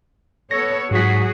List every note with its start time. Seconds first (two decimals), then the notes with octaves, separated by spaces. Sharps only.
0.51 B3 A4 C#5 A#6
0.91 G#2 F#3 F#4 G#4 B6